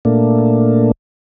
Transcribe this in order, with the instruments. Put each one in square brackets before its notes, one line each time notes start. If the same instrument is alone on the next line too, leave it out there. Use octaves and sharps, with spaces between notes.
[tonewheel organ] A#2 A3 A#3 D4